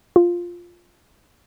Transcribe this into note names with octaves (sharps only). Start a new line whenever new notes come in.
F4